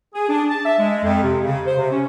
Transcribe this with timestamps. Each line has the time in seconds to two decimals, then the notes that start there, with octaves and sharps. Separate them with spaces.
0.14 G#4
0.29 D4
0.49 A5
0.66 E5
0.79 G#3
1.04 F2
1.23 C3
1.43 C#3
1.66 C5
1.78 C3
1.91 C#4